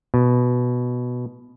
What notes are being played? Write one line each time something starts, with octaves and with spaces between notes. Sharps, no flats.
B2